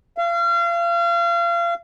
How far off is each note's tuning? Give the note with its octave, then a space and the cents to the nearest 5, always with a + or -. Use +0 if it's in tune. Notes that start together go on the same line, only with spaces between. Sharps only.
F5 -35